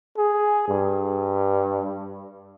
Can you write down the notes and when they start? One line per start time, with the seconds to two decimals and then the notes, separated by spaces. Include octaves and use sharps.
0.17 G#4
0.68 G2